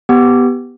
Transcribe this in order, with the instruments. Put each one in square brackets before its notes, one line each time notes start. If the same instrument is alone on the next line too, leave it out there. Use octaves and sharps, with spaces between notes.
[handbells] B3 G4